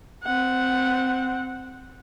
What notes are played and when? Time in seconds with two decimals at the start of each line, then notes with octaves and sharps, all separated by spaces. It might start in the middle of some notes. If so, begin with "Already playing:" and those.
0.24 C4 F#5